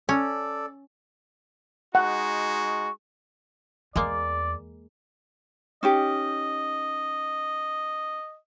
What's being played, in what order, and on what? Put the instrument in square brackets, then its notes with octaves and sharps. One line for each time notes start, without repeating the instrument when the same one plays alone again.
[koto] C#4 [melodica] A4 D5
[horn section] G#3 D#4 F#4 [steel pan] F#5 [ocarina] C#6
[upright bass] E2 [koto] G#3 A#3 [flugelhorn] D5
[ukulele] C#4 D#4 G4 [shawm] D#5